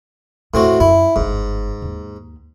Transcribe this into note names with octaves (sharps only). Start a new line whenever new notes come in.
E2 A2 C4 F#4
F#2 E4
G1 G#2 C4
D#2